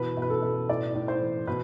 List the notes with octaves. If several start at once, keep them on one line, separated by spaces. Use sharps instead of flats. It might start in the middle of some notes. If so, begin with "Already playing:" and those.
Already playing: B2 E3 B4
B2
B4
A4
B2
A2 D5
A2
C5
E3
B2 B4